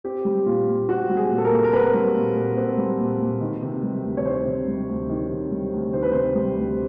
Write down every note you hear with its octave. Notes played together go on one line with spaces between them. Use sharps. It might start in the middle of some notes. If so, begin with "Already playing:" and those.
C4 G4
G3
A#2 F4
A#2
C4 F#4
G3
G#4
A#2
A4
A#4
A#2
A#4
C4 B4
G3
A#2
A#2
C4
G3
A#2
A#2
D#3
C3
G3
D2
C#5
D#3 C5
C3
G3
D2
D#3
C3
G3
D2
D#3 C5
B4
C3 C5
G3
D2